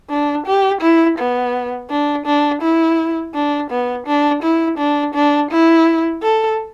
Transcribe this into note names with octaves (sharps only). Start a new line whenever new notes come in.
D4
G4
E4
B3
D4
D4
E4
D4
B3
D4
E4
D4
D4
E4
A4